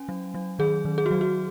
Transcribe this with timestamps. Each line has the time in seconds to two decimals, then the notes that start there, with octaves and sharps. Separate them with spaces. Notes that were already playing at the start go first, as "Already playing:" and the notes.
Already playing: C#4 G#5
0.09 F#3
0.34 F#3
0.59 D#3 G#4
0.85 D#3
0.98 G#4
1.06 F#4
1.11 F#3
1.21 F#4